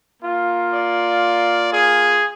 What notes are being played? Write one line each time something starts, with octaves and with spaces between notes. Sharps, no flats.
A#3 F4
D5
G#4